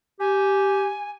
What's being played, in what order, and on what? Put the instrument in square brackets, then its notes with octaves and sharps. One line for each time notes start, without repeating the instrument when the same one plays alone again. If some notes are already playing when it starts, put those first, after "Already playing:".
[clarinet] G4 [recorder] G#5